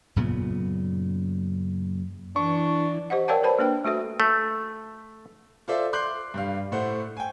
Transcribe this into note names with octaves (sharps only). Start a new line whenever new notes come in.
F#2 A#2 C#3 B3
E3 D4 C#6
G4 C5 D#5 F#5
A#4 C#5 D5 F5 G5 A5
B4 C5 A5 B5
A#3 D4 B4 G5
A3 F#4 A4 E5
A3
F4 A4 C5 D5 E5
C6 D6 F#6 G6 C7 F#7
G2 G3 F5
A2 A3 C5 F#5
G5 G#5